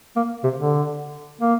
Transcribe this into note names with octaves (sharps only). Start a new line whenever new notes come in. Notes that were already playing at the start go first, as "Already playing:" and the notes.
A#3
C3
D3
A#3